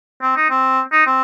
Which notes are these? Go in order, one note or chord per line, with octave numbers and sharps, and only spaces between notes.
C4
D#4
C4
D#4
C4